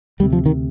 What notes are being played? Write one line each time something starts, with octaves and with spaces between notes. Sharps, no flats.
D2 C3 G3
F3
D#3